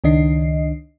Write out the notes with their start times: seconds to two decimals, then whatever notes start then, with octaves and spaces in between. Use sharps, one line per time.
0.04 C#2 D#3 D4 D#5 C7